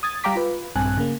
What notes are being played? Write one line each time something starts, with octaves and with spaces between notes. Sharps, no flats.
D#6 G#6 A6
G3 F5 G5 A#5 D6 B6
F4 B4
A#1 G2 C4 G#5 A5 F#6
C#3 A#3